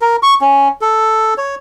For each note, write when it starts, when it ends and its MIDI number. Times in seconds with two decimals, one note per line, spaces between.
0.02 0.16 70
0.23 0.34 85
0.41 0.68 61
0.81 1.34 69
1.38 1.55 73